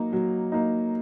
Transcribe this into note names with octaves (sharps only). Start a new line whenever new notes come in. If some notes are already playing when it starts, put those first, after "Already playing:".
Already playing: F#3 A#3 D#4
F#3
A#3 D#4